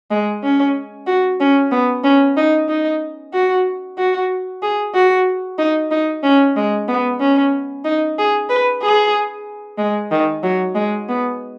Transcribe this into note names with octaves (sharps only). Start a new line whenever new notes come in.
G#3
C#4
F#4
C#4
B3
C#4
D#4
D#4
F#4
F#4
G#4
F#4
D#4
D#4
C#4
G#3
B3
C#4
D#4
G#4
B4
G#4
G#3
D#3
F#3
G#3
B3